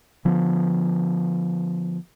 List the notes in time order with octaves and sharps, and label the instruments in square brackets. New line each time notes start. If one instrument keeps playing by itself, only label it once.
[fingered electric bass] D3 F3 B3